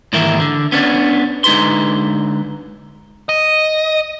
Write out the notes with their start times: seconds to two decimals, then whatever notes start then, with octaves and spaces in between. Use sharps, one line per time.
0.13 G#2 D#3 E3 A#3 A#4 E5
0.40 D3
0.72 B3 C#4 D4
1.44 D3 G#3 D#4 B4 C6
3.29 D#5